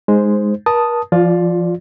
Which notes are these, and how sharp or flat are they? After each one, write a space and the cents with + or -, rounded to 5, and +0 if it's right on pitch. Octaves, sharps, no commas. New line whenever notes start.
G#3 +0 D#4 +0 C5 +0
A#4 +40 A5 +0 D#6 +0
F3 -25 F4 +15 D5 +0